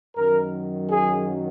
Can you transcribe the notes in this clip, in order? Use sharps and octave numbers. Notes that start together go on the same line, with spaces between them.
F#2 D#3 F#3 A#4
G#4